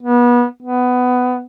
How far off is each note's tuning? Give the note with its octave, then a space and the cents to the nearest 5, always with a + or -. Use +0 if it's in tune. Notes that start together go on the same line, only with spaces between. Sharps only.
B3 -30
B3 +15